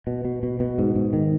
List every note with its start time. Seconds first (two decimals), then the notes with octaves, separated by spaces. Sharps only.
0.07 B2
0.25 B2
0.43 B2
0.60 B2
0.78 G#2
0.95 G#2
1.13 D#3